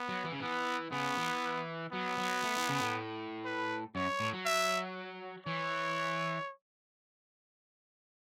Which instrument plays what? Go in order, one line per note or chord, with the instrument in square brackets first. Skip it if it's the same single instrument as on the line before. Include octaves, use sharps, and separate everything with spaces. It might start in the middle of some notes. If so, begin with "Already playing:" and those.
Already playing: [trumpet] B3
[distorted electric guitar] F#3
E3
C#3
[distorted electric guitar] E3 [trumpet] B3
[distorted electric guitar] C#3 [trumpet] B3
[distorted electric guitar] E3
[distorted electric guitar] F#3 [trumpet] B3
[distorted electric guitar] F#3
A3
E3
C#3
A2
[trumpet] B4
[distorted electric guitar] F#2 [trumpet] C#5
[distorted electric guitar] A2
F#3
[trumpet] E5
[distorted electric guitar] E3 [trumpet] C#5